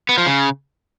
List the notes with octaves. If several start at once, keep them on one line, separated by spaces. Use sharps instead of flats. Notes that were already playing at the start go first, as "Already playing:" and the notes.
B3
F3
C#3